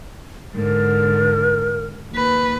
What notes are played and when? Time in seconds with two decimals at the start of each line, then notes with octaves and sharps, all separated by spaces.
0.54 G#2 D3 A#4
2.13 D#2 B4